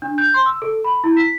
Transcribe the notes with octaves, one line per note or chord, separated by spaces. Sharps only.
D4
G6
C6
E6
A4
B5
E4
B6